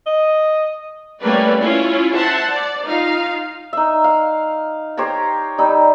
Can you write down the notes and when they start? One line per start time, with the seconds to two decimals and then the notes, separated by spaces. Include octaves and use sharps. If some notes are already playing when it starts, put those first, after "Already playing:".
0.06 D#5
1.22 G3 A3 A#3 C#4 B4 D5
1.61 C#4 E4 F4
2.16 C5 E5 F#5 A5
2.49 D5
2.85 D#4 F4 F5
3.73 D#4 E5
4.04 F5
4.97 G4 C5 C#5 A#5
5.58 G3 D#4 E6